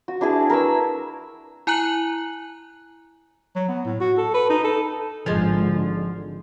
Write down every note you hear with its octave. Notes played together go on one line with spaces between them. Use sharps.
F#4
D4 E4 G#4 A5
A#4 B4 C#6 E6
E4 G#5 A#5 F#6 F#7
F#3
B3
A2
F#4
A4
B4
D#4
A4
G#1 D3 F3 G#3